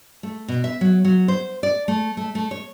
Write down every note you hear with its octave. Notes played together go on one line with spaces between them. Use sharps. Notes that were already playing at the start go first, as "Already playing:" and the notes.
A3
B2
E5
F#3
F#3
C5
D5
A3
A3
A3
C#5